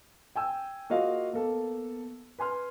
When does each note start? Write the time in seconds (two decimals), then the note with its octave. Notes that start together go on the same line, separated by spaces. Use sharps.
0.36 G5 G#5 E6
0.90 A#3 F4 F#4 G#4 D#5 F5
1.33 A#3 B3 A4
2.39 B4 G#5 C6 F6